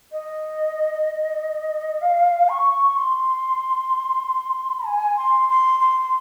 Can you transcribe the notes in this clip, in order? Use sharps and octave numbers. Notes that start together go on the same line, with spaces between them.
D#5
F5
C#6
C6
G#5
C6
C6
C6